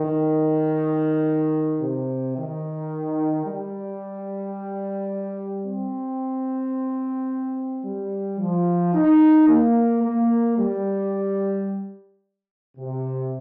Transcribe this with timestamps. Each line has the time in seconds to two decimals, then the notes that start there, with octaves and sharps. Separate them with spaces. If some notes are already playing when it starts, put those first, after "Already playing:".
Already playing: D#3
1.81 C3
2.36 D#3
3.46 G3
5.64 C4
7.84 G3
8.38 F3
8.94 D#4
9.48 A#3
10.03 A#3
10.58 G3
12.78 C3